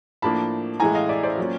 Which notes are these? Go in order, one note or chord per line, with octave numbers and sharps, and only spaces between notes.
A2 F3 A#3 D4 A5 B5
A2 E3 G#3 G#5 A#5
D#5 F5
D5 E5
C5 D5
F#3 A#3 C#4 F4